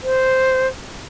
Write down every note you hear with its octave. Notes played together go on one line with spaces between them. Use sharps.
C5